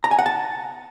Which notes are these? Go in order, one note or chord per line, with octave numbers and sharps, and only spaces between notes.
A#5
G#5
F#5
A5